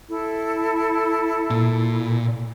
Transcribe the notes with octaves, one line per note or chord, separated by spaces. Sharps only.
E4 A4
A#2